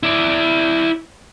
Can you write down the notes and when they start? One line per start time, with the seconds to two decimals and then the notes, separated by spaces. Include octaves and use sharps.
0.03 E4 D5